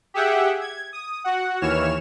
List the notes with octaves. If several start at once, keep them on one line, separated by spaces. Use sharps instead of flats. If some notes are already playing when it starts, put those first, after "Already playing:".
G4 G#4 E5 F#5 G5
G#6
D#6
F#4 F#5
D#2 E3 C#5 F6 E7